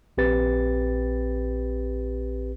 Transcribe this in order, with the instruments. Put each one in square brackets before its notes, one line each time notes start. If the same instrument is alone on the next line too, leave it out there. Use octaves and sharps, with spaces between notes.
[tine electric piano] A#1 C4 G4 B4 A6